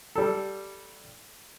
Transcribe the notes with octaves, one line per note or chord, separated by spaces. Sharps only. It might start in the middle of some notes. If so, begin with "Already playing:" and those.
G3 A4